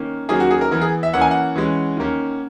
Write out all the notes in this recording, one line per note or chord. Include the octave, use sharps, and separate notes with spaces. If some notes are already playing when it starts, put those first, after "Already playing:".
Already playing: D#3 A#3 C#4
D#3 F#3 A#3 C#4 G#4
F#4
G#4
A#4
E3 B3 A#4
G#4
E5
E3 A#3 C#4 F#5
G#5
F#5
E3 G#3 C#4
D#3 A#3 C#4